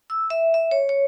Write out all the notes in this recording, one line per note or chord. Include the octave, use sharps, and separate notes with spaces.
E6
E5
E5
C#5
C#5